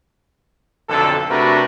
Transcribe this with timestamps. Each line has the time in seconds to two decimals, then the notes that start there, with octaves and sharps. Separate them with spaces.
0.89 B1 F2 D3 A4
1.29 C3 A3 D4 F#4 A#4 B4